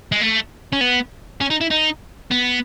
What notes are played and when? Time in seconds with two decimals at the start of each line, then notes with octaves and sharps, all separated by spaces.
0.12 G#3
0.21 A3
0.73 C#4
0.81 B3
1.41 C#4
1.50 D#4
1.61 E4
1.71 D#4
2.31 B3